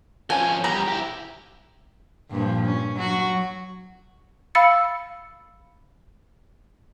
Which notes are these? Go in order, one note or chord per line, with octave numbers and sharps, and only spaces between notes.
F3 C#4 G#5
E2 G3 A#5
E4 G4
G2 A#2 F3
C#4
F#3 F#4
F5 B5 E6 A6 C#7